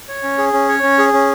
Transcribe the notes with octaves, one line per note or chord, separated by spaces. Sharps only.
C#5
C#4
G#4
C#4
C#5
C#4
G#4
C#4